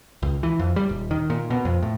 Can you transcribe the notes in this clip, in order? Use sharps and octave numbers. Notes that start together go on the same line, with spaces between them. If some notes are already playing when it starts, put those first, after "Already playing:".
C#2
E3
F2
G3
D#1
D#3
A#2
B2
F2
A2